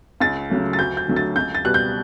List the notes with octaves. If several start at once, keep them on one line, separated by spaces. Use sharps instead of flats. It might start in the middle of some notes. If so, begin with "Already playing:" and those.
C#2 A6
C#3 F#3 A3
A6
D2 G6
G6
D3 F#3 A3
A6
C#2 G6
A6
B2 G3 F#6
G6